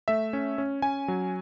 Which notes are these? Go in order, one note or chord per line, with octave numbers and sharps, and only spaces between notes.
A3 E5
C#4
C#4
C#4 G#5
F#3